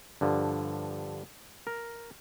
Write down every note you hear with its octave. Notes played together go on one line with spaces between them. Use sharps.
G2 D3 F3
A#4